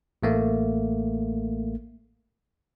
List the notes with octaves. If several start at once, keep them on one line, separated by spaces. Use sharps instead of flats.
A1 A3 A#3